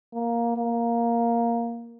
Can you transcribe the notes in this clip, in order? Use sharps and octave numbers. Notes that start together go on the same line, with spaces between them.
A#3
A#3